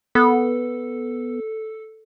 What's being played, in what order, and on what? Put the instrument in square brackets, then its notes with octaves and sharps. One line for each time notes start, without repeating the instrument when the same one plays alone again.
[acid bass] B3 [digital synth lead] A4